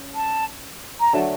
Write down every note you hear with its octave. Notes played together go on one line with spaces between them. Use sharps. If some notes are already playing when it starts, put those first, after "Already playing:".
Already playing: C#4
A5
A#5
D3 F#3 A3 A5